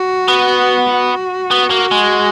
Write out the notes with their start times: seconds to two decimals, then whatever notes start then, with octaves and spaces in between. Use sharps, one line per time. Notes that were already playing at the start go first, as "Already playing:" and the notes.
Already playing: F#4
0.28 B3
0.89 F#4
1.51 B3
1.71 A#3
1.91 G#3